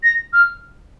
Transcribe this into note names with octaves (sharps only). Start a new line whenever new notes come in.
A#6
F6